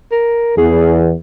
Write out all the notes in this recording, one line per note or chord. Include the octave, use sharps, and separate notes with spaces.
A#4
E2 G#4